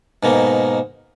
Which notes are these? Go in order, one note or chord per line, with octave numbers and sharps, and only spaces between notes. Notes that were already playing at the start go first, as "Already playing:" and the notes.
G#2 B2 A#3